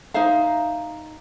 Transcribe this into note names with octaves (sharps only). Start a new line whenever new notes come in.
D#4 C5 E5 F5